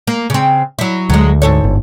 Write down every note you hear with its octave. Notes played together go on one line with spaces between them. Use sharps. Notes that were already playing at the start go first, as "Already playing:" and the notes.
A#3
C#3 C4
F#3 E4
D2 F#3 G#3
G#2 A4 C#5
G1